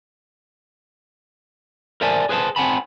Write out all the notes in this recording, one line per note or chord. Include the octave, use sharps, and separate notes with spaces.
A#4 C5 D5 E5 G#5 A5
G#4 B4 C5 E5 A5
C4 F#5 G#5 A5 B5